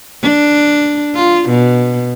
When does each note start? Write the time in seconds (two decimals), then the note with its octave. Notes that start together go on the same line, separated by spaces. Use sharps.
0.23 D4
1.15 F4
1.50 B2